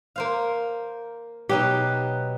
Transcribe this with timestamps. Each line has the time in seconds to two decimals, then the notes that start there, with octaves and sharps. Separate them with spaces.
0.16 A#3 C5 F5
1.49 B2 F#3 D#4 G4